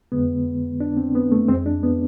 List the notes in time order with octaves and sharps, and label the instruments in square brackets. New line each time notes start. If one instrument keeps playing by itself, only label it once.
[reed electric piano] F2 D3 G#3 B3
D4
C4
B3
A3
F2 E3 G#3 C4
D4
B3